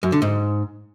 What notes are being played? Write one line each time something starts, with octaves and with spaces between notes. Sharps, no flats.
F#2
D3
G#2